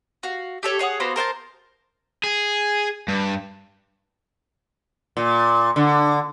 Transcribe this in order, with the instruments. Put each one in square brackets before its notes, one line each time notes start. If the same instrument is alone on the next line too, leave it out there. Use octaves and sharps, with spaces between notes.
[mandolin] F#4 F5
G4 A4 C#5
G#4 C#5 F#5 D#6
A#3 B3 F#4 C5
A#4 C5 G5 A5
[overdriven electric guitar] G#4
G2
[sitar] A#2
D3